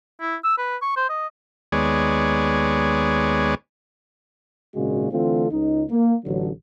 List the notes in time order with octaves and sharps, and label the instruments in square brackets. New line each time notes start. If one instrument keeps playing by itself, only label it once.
[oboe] E4
E6
B4
C#6
C5
D#5
[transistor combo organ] D#2 G#3 B3 G#4 C#5 D5
[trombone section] G#1 A#2 C#3 G#3 A#3 F#4
D3 E3 A3 C4 F4 A4
C#2 D#4
A#3
A1 D3 F#3